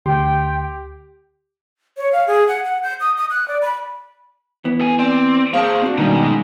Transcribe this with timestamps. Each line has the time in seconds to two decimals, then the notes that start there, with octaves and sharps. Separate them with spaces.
0.06 D2 G4 G5 C6
1.98 C#5
2.12 F5
2.28 G#4
2.48 F#5
2.64 F#5
2.83 G6
3.00 D#6
3.17 D#6
3.30 F#6
3.48 D5
3.62 B5
4.65 E3 B3
4.81 A4 G#5
4.99 C4 D5
5.53 A#3 G#4 A#4 C5 F5 A5 C#6
5.82 C4 D4 F#4
5.98 F#2 B2 D#3 G3 G#3 A#3 C#4 D#4